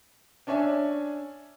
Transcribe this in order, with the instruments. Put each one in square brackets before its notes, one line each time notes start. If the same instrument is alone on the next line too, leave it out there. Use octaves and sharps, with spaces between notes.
[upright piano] C#4 D4 C#5 E5 G#5